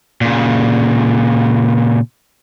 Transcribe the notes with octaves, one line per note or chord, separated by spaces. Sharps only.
A#2 C#3